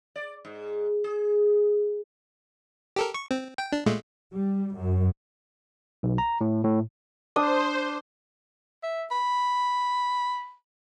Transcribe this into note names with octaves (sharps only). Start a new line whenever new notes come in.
D5
G#2
G#4
G4 A4 A#4
C#6
C4
G5
D4
A#2 G#3 A3
G3
F#2
B1
A#5
A2
A2
D4 C5 D#6
E5
B5